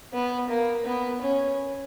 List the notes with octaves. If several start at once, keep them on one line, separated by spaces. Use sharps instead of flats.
B3
A#3
B3
C#4